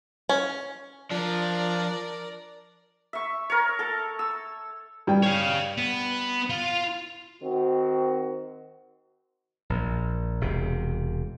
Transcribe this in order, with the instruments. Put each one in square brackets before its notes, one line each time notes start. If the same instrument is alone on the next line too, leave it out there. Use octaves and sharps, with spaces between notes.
[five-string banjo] C#4
[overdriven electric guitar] F3 [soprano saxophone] D4 [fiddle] A#4 D5
[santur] E5 C#6
A#4 C#5
A4 A5
E6
[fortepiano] G2 G5
[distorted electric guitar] C#5 F5
B3
F4
[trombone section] D#3 C4 F#4
[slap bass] A#1
E1 C3